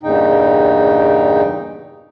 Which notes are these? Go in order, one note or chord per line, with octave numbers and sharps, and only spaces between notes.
E2 G2 A#2 C#3 D#4 G5